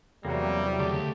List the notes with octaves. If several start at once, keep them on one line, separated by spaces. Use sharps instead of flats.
E2 C3 F#3 G3 A#3
D2 C#3 A3 G4